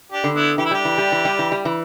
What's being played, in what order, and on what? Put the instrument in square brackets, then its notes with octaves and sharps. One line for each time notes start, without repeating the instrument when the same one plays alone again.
[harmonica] D4 G4
[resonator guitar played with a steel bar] D3
[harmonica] B3 E4
[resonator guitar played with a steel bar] E3 [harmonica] G4
[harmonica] E4
[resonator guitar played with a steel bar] G3 [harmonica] D4 G4
[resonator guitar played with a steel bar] E3
G3
E3
G3
E3
G3
E3